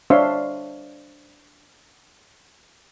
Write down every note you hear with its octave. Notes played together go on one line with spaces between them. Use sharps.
D4 C5 C#5 E5 F5 C6